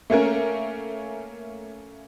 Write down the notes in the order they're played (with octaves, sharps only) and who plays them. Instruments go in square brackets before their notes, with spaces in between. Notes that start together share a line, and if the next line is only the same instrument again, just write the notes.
[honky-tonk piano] A3 A#3 C#4 A#4